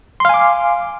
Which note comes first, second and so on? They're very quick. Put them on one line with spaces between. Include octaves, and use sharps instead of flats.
C6 F5 G#5 D6